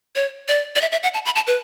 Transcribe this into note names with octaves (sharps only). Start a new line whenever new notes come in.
C#5
D5
D5
E5
E5
F#5
A5
B5
A5
B4